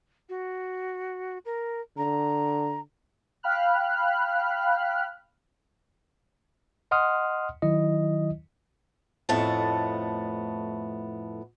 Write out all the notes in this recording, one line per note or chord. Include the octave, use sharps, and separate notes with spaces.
F#4
A#4
D3 A#5
F5 G5 B5 F6 F#6
D#5 F#5 C6 D#6 F6
D#3 F#3 E4 D#5
F2 A2 A3 B3 D#5 A5